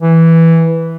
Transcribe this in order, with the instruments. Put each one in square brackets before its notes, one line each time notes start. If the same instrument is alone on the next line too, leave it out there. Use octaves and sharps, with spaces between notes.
[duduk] E3